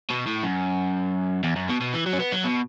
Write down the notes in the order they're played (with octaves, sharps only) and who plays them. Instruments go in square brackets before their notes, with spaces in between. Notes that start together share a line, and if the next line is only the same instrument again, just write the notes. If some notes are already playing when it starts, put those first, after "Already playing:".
[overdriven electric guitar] B2
A2
F#2
E2
F#2
B2
B2
E3
F#3
C#4
B3
F#3
B2